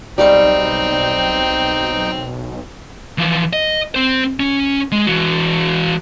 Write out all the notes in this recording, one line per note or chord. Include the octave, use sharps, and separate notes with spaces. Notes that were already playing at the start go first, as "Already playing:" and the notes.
B1 G3 C4 D#4 F5 G5 C#6
E3 F3
D#5
C4 C5
C#4
G#3
E3 F#4